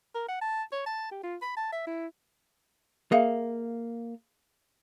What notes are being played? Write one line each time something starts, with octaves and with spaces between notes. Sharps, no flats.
A#4
F#5
A5
C#5
A5
G4
F4
B5
A5
E5
E4
A#3 G#4 E5 F5